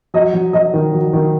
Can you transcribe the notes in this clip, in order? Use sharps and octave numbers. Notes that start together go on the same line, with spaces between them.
F#3 D#5
F#3
F#3 D#5
D#3
F#3
D#3